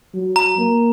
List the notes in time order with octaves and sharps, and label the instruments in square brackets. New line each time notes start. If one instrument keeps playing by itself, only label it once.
[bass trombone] F#3
[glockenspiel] A#5
[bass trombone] A#3